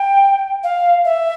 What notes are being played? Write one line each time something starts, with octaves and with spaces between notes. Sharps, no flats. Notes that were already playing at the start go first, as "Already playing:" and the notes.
Already playing: G5
F5
E5